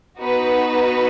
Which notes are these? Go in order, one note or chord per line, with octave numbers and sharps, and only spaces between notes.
B3 D#4 F#4 B4